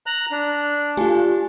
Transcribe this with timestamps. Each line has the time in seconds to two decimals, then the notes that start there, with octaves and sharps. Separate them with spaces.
0.06 A#5 F#6
0.31 D4
0.97 A3 F4 G4 G#5